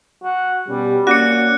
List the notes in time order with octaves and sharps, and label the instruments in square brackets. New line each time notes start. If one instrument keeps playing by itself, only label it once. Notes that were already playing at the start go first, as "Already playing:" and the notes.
[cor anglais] F#4
[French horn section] B2 C#4 G4 [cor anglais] G3
[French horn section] A#3 C#4 [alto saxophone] F#4 [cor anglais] D5 [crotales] F#6 C#7